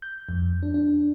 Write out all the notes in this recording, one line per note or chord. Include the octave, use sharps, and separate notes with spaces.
G6
F2
D4
D4